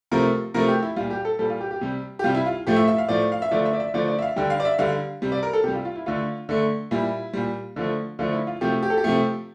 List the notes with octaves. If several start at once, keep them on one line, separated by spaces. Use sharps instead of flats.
C3 F3 A3 A#4
C3 F3 A3 A#4
G4
E4
A#2 G3 F4
G4
A4
A#2 G3 A4
F4
G4
G4
C3 G3
G4
C3 G3 F4
E4
F4
A2 F3 A3 G4
E5
E5
F5
A2 F3 A3 D5
F5
E5
D3 F3 A3 D5
E5
D5
E5
D3 F3 A3 D5
D5
E5
F5
D3 G3 G5
F5
D5
E5
D3 G3 F5
C3 G3
D5
A#4
A4
C3 G3 G4
F4
F4
E4
D3 A3 F4
D3 A3
A#2 G3 E4
A#2 G3
D3 F3 A3
D3 F3 A3 F4
E4
F4
C3 F3 A3 G4
G4
A4
G4
C3 F3 A3